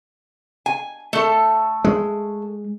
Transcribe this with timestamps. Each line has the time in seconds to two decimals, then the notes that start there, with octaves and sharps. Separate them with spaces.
0.66 G#5
1.13 A3 A4
1.84 G#3